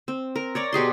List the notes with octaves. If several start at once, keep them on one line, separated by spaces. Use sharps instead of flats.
C4
A#4
C#5 D5 A#5
B2 G4 G#4 C6